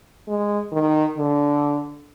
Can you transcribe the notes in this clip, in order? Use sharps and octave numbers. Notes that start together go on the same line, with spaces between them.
G#3
D#3
D3